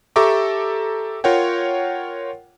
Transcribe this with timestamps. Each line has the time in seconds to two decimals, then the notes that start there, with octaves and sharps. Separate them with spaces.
0.16 G4 A4 E5 A#5 C#6 D6
1.24 F4 A#4 C#5 F#5 G5